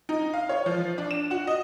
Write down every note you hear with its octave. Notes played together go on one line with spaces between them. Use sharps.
D#4
F5
C#5
F3
D4
E7
F#4
D#5